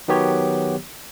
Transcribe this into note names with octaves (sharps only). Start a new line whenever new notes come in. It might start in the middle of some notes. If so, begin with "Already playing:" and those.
D#3 F#3 B3 G4 C#5